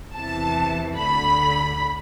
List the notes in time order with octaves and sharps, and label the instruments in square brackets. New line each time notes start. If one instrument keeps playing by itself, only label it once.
[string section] E2 C3 E3 A5
D2 D3 B5